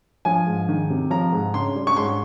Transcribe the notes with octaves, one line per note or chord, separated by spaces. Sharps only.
F3 G#5
G#2
D#3
C3
F3 A#5
G#2
C#3 C6
G3
C#6
G#2 C6